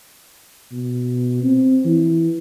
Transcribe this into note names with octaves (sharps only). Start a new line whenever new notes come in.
B2
C4
E3